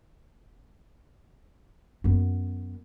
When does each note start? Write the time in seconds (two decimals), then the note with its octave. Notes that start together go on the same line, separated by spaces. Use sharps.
2.04 F#2 B3